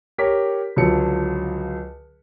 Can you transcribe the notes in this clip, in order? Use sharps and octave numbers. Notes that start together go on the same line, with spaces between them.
G4 A#4 C#5 B6
C#2 D3 F3 F#3 C#7